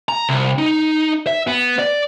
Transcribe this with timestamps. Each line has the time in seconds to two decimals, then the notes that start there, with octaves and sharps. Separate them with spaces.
0.09 A#5
0.29 C2
0.58 D#4
1.27 E5
1.47 B3
1.79 D5